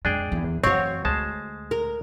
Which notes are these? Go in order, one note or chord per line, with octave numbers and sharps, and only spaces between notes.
F2 G#3 D4 G#4 G5
E2 D3
F#2 E3 C4 F#4 C#5 F5
D2 G#3 C5 A5
A#4